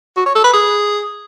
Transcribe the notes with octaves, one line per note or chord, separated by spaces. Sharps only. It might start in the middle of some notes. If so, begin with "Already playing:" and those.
F#4
C#5
A4
B4
G#4